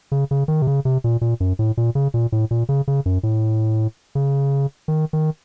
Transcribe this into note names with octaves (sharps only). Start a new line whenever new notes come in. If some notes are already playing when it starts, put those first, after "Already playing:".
C#3
C#3
D#3
C3
C#3
C3
A#2
A#2
F#2
A2
A#2
C#3
A#2
A2
A#2
C#3
C#3
F#2
A2
C#3
D#3
D#3